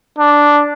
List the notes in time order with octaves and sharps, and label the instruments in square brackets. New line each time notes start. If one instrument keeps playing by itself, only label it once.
[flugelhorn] D4